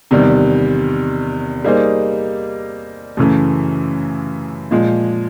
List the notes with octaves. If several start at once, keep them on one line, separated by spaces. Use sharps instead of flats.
E2 C3 D#3 G3
G3 A#3 D#4 G#4 C5
F#2 C#3 E3 A3
A#2 F3 G#3